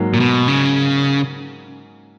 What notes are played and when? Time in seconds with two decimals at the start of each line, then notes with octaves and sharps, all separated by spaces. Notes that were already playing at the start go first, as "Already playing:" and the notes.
Already playing: G#2 F#3 A#3
0.14 A#2
0.20 B2
0.48 C#3